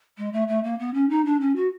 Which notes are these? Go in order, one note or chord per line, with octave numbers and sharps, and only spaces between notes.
G#3
A3
A3
A#3
B3
C#4
D#4
D4
C#4
F#4